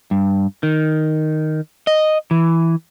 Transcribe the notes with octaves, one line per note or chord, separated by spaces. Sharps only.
G2
D#3
D#5
E3